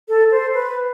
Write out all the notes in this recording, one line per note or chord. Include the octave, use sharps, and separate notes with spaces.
A4
C5
B4